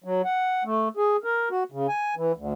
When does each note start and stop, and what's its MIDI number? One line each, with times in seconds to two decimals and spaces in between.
0.04 0.22 54
0.25 0.63 78
0.65 0.89 57
0.97 1.17 68
1.24 1.49 70
1.51 1.63 66
1.72 1.87 49
1.89 2.15 80
2.16 2.32 52
2.37 2.53 38